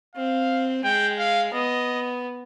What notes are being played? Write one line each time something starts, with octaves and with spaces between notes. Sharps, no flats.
C4 F5
G#3 G5
F5
B3 D#5